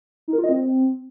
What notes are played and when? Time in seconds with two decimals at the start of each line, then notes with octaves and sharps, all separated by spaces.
0.28 D#4
0.33 A#4
0.38 F4
0.44 D#5
0.49 C4